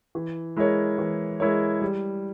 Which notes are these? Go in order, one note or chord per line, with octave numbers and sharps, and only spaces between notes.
E3
G#3 E4 A#4 C#5
E3
G#3 E4 A#4 C#5
G3